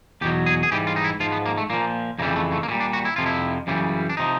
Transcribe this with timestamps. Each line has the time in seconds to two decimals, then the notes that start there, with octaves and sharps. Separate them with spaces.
0.21 E2 B2 F#3 G4
0.46 G#4
0.63 G#4
0.72 G#2 E3 G3 G4
0.87 F4
0.96 D#4
1.04 E4
1.20 G#2 F3 F4
1.32 B3
1.46 A#3
1.58 A3
1.70 A#2 F3 A#3
2.19 F2 C#3 E3 G3 A#3
2.36 A3
2.52 A3
2.63 A#3
2.68 A#2 G3 A3
2.80 D4
2.93 F#4
3.05 E4
3.16 F2 C3 F3 F4
3.26 E4
3.67 F#2 C#3 E3 G3
4.09 D4
4.17 C3 F3 D#4